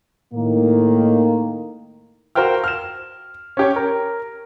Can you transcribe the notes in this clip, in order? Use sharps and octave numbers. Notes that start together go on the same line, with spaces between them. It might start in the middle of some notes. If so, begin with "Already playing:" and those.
A2 D#3 A#3
F#4 A#4 C5 F5 G5 F6
F6 E7
C#4 G4 C#5
A#4